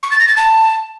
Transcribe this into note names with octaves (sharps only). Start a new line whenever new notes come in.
C#6
A6
A#6
A6
A5